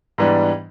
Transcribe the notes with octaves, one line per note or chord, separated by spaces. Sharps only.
G#2 E3 G3 B3 D4